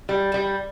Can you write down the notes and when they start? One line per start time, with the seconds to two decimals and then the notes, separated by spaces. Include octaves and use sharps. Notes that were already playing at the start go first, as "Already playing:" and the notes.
0.09 G3
0.34 G3